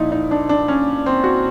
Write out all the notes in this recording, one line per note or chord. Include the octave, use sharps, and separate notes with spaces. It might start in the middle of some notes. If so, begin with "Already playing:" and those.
Already playing: A#2 F3 D#4 E4
D#4
D4
D4
C#4
C4
F#4